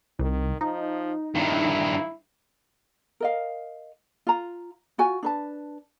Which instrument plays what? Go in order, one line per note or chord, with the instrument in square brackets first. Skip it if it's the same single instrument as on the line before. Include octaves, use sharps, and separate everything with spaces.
[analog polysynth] C2 [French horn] D#3
[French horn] F3 [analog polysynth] D#4
[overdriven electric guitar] G2 D#3 [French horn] E4
[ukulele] A#4 D#5 F5
F4 A#5
F4 F#4 G#5
D4 B4 A5